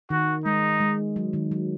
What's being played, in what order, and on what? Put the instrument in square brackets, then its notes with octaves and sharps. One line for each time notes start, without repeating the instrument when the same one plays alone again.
[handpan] D#3 [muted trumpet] F#4
[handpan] G#3 [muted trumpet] D#4
[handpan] G#3
F#3
D#3
F#3